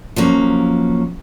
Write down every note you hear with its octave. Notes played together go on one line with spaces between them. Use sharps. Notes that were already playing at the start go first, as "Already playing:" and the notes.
F3 F#3 A#3 C#4